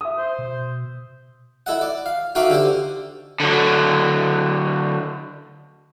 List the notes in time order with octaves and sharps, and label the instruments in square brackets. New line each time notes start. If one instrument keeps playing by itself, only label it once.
[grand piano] E5 D#6
[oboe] C5
[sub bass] B2
[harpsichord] E4 A4 D#5 F#5
D5
F5
D#4 F#4 A4 E5 F5 D6
D3 G4 A4 C5
[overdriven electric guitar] D3 F#3